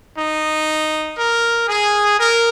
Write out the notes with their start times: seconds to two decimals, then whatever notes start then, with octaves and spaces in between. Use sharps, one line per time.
0.17 D#4
1.17 A#4
1.67 G#4
2.18 A#4